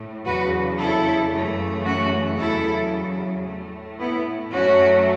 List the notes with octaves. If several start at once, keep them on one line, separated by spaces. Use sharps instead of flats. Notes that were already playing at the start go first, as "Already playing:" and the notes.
Already playing: A2 A3
E2 C#3 F#3 F#4 B4
E4 A4
F#2 C#3 E3 A3
C#4 F#4
E2 C#3 F#3 E4 A4
A2 A3
B3 E4
F#2 F#3 A3 C#4 F#4